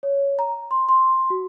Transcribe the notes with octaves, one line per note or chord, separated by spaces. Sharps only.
C#5
A#5
C6
C6
F#4